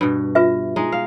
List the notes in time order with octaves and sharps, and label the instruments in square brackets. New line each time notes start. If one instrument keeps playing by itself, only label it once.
[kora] G2 B2
[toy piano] F4 B4 E5
[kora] G#3 D#4
F5